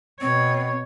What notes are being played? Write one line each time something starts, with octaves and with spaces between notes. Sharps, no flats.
B2 C4 C#5